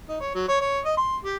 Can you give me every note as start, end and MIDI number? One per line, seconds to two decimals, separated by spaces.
0.09 0.16 63
0.20 0.31 73
0.35 0.47 54
0.48 0.60 73
0.61 0.79 73
0.85 0.93 75
0.97 1.17 84
1.24 1.37 67